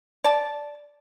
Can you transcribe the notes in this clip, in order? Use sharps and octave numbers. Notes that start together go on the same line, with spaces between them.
D5 A5